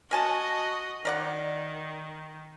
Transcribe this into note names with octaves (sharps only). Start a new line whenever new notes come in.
F#4 A#4 D#5 G#5 A5
D#3 A#4 D5 F#5